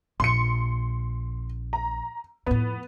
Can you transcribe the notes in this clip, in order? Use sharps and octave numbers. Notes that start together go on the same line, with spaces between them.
A#1 C6 C#7
A#5
F2 A2 B3